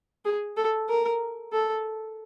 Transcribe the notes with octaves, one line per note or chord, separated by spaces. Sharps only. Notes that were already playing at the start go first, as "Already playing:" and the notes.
G#4
A4
A#4
A4